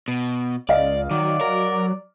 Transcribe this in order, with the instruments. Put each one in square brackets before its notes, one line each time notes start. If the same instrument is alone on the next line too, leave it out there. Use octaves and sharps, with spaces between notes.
[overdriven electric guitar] B2
[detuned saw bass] C#2 [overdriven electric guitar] D5 [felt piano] D#5 F5
[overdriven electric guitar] D#3 [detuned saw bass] F#3 [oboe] D5
[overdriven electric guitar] A#4